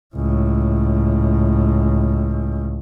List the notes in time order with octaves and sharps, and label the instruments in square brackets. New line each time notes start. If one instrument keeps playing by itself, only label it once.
[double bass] C#2 A2